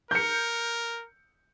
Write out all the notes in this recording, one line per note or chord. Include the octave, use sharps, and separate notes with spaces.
A#4 G6 C#7